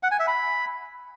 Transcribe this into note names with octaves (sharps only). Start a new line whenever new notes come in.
F#5
G#5
E5
B5